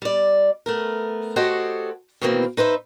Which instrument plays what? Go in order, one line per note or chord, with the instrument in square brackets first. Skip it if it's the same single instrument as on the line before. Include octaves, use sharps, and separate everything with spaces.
[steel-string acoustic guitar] G3 D5
A3 B3 A#4
F#4 G4 A4 C5 C#5 D#5
B2 D#3 E3 A#3 C4
D#4 B4 C5 E5